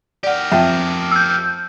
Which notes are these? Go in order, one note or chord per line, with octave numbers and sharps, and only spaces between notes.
G4 A#4 D5 F#5
F2 E5 G5
E6 G6